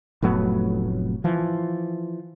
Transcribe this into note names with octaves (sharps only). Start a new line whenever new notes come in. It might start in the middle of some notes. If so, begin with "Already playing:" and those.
F1 A2 F#3 B3
E3 F3